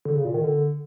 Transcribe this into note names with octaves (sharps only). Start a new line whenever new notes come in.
D3
C#3
A#2
D#3
D3